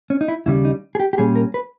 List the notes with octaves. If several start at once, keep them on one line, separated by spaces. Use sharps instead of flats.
C#4
D#4
E4
D#2 C#3 G3 E4
D#4
G#4
G4
G4
A#2 G3 C#4 G#4
A#4
B4